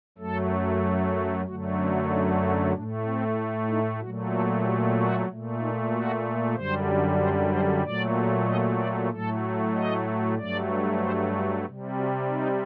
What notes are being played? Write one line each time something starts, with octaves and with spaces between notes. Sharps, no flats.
F#2 F#3 A3 A4
F#2 D3 F#3 A3 F#4
C4
D#4
F#4
A2 A3 D4
C4
D#4
A#2 F#3 A3 F#4
A4
G4
F#4
A#2 A3
D#4
F#4
F#2 D3 G3 C5
C5
C5
A#2 F#3 A3 D5
D#5
D5
A2 F#3 A3 A4
D#5
G2 F#3 A3 D5
C5
C3 G3
F#4
D#4